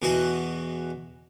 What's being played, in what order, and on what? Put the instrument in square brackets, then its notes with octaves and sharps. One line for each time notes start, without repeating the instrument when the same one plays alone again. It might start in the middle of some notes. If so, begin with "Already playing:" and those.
[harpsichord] E2 B2 E3 F#4 D#5 F#5